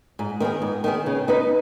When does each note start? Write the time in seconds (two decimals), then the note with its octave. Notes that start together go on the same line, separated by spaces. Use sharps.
0.19 G#2
0.40 D#3 B3 G#4
0.62 G#2
0.84 D#3 B3 G#4
1.06 C#3
1.28 B3 D#4 B4 D#5